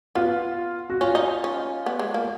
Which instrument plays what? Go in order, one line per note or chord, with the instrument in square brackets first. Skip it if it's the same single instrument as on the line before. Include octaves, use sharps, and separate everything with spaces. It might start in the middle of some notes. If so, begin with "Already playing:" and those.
[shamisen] B3 [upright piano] F4
[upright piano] F#4
[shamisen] C#4 [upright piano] F4
[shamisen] D#4
C#4
B3
G#3
A#3